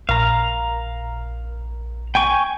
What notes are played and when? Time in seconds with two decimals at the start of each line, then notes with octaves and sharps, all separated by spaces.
0.09 A#1 F5 A#5
2.15 G5 G#5 C#6